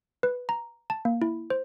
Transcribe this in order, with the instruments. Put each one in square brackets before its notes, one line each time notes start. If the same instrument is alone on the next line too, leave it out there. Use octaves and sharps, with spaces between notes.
[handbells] B4
A#5
A5
A#3
E4
C5